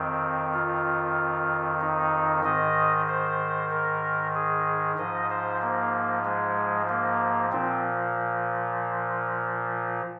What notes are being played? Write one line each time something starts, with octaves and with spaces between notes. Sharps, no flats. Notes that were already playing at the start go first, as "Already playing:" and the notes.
Already playing: F2 D#3 C4
F4
D#4
G#2 D#3 D#5
C5
A#4
G#4
G#2 F3 D#5
C5
A#3
G#3
A#3
A#2 F3 C4